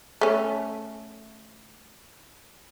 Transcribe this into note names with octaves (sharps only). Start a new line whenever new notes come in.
A3 C#4